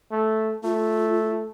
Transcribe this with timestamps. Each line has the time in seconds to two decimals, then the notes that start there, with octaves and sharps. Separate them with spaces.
0.12 A3
0.64 A3 F4